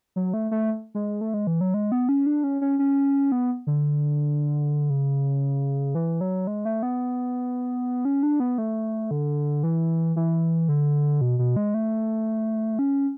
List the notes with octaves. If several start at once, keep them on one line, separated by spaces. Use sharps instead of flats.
F#3
A3
A3
G#3
A3
G#3
E3
F#3
G#3
B3
C#4
D4
C#4
C#4
C#4
B3
D3
C#3
E3
F#3
G#3
A3
B3
C#4
D4
B3
A3
D3
E3
E3
D3
B2
B2
G#3
A3
C#4